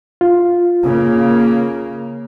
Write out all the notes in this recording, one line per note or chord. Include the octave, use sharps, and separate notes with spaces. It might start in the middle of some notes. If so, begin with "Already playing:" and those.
F4
C#3 A#3